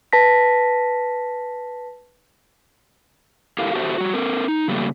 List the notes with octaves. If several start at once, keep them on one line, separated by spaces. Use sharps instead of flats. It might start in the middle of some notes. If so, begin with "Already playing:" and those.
B4 A5 A#6 B6
E4 G4 A4 A#4 F5
F#4 G4 A4 C5 E5
G3 F#4
C4 A4 A#4
D#4
C#3 F#3 G3 A3 A#3